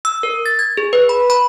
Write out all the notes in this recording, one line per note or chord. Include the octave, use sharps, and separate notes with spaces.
E6
A#4
A6
G#6
G#4
B4
B5
B5